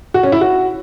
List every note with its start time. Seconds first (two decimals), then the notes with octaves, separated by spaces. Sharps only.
0.14 F#4
0.23 C#4
0.32 E4
0.41 F#4